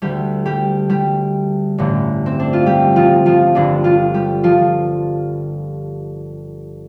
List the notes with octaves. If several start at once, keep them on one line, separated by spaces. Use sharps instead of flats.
D2 D3 G3 G4
G3 G4
G3 G4
A1 G2 D3
C4
D4
F4
G3 G4
F3 F4
F3 F4
G1 G2 D3 D4
F3 F4
G3 G4
F3 F4